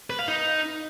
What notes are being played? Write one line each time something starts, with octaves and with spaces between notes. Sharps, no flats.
B4
F5
D#4